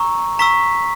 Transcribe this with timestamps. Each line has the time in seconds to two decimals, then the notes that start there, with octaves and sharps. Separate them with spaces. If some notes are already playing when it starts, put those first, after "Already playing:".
Already playing: A#5 C#6 E6
0.39 A#5 C#6 E6 B6